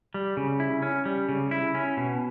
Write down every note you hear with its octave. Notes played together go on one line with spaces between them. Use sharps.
G3
C#3
E4
C#4
G3
C#3
E4
C#4
B2